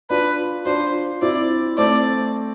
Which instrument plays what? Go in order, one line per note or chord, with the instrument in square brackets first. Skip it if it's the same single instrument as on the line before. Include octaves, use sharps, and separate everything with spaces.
[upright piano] D4 F4 [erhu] B4
[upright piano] D4 F4 [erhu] C5
[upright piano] C4 E4 [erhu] D5
[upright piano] A3 C4 [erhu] D5